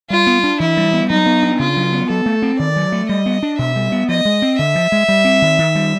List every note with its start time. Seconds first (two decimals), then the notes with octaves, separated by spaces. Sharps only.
0.10 G3 F4
0.27 B3
0.44 D4
0.60 E3 E4
0.77 G3
0.93 B3
1.10 F#3 D#4
1.26 B3
1.43 D4
1.59 C#3 F4
1.76 F#3
1.93 B3
2.10 F#3 A4
2.26 A3
2.42 C4
2.59 D#3 D5
2.76 F#3
2.92 A3
3.09 G3 D#5
3.26 B3
3.43 D4
3.58 B2 E5
3.76 G3
3.92 B3
4.09 F3 D#5
4.25 G#3
4.42 C4
4.59 D3 E5
4.75 F3
4.92 G#3
5.08 G3
5.25 C4
5.42 D#3
5.58 D#3
5.75 G3